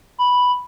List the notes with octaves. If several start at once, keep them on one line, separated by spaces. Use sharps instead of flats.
B5